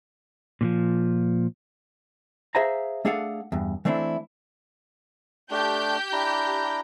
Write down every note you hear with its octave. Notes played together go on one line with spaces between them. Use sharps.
A#2 D#3 F3
G#4 C5 E5 F5 G#5 A#5
A3 D4 G#4 A4 F5 F#5
E2 G2
E3 A3 C4 D4 E4
A3 D4 G4 G6
D4 E4 A#5